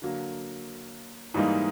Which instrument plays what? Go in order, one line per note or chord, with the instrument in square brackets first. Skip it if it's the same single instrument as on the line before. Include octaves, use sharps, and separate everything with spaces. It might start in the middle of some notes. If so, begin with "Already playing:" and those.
[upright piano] D3 F#3 A#3
G#2 E3 G3 A#3 D#4